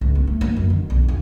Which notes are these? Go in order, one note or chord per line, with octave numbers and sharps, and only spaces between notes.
C#2
B3
A3
A#3
F#2
D#3
B1
E2